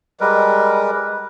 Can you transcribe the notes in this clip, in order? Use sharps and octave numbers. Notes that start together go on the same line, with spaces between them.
G3 G#3 A#4 B4